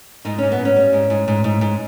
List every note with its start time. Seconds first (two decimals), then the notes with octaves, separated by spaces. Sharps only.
0.25 G#2 D#4
0.38 G#2 C#4
0.52 B3
0.59 G#2
0.65 C#4
0.76 G3
0.93 G#2
1.10 G#2
1.28 G#2
1.44 G#2
1.61 G#2